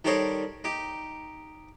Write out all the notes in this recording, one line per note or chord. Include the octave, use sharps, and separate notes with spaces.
D#3 G3 A4 C5 C#5 D#5
D#4 G4